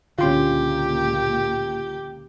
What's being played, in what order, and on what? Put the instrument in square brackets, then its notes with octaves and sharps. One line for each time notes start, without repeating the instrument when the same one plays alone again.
[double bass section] C#2 A#2 A#3 [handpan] D3 C#4 [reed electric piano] F4 C6 [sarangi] G4